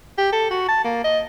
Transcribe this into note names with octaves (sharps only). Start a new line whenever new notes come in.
G4
A4
F#4
A5
A#3
D#5